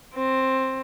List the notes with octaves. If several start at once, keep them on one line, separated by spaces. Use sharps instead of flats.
C4